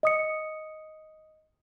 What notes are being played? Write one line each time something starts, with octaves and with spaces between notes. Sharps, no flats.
D#5 D#6 C#7